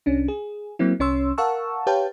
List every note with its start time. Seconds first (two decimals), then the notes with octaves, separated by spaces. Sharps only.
0.06 C2 C#4 D4
0.28 G#4
0.79 F#3 A#3 C4 E4
1.00 C2 C#4 C#5 C6 E6
1.38 A#4 F5 F#5 A5 C#6 E6
1.87 G4 B4 C#5 F5 G5 A5